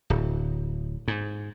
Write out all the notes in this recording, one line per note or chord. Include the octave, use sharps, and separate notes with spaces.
D1
G#2